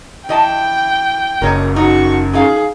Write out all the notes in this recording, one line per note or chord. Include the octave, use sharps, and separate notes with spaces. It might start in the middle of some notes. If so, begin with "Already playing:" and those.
E3 D#5 G5 A5
F#1 A#4 C#5 D#5
D#4 F#4 C#6
C#4 D#4 G#4 F5